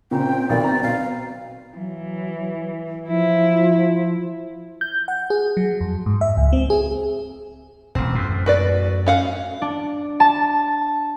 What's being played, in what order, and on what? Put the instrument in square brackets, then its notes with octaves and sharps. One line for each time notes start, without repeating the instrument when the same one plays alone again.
[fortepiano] A#2 C#3 [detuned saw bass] C4 [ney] G5
[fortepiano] B1 D#3 F#3 [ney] D5
[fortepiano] A#5
[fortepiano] B2 [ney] F5
[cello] E3 [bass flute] F#3
[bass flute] F3 [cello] E4
[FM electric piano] G6
F#5
G#4
F#3
F2
G#2
E5
C#2
C4
G#4
[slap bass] E1 A1 [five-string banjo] C4
[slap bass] F#2 A2
[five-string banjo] F#4 B4 D5
C#4 F5 F#5
[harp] D4
A5